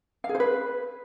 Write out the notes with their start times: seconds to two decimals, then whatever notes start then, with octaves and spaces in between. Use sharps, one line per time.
0.24 F5
0.29 G#4
0.35 C5
0.40 B4